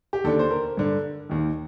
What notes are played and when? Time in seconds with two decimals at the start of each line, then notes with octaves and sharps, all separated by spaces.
0.13 G4
0.24 D#2 D3 A4
0.39 C5
0.51 A#4
0.77 G2 D3
1.29 D#2 D#3